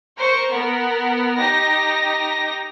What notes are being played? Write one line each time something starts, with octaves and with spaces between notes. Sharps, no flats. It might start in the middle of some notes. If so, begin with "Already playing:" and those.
A#4 C5 C#6
B3 A#4
D#4 G4 A#6